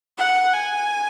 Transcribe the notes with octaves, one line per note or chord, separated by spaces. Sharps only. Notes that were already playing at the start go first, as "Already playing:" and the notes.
F#5
G#5